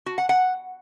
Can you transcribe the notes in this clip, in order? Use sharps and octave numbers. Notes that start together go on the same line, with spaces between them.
F#4
F#5
F#5